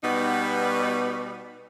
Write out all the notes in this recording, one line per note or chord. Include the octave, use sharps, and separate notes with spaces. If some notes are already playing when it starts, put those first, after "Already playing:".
B2 G3 B3 D#4